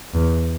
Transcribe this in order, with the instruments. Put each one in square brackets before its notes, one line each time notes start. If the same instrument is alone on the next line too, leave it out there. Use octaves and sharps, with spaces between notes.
[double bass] E2